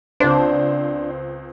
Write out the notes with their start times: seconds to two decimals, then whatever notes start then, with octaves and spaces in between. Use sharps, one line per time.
0.20 C#2 C4 D4 C5